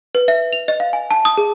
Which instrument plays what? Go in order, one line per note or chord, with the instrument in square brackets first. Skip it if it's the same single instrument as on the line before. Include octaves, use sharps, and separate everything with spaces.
[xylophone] B4
E5
F7
D#5
F5
G#5
A5
D#6
G#4